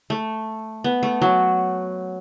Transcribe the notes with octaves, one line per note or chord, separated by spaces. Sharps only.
A3
B3
A3
F#3